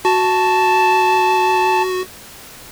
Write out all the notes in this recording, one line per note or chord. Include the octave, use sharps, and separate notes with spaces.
F#4 A5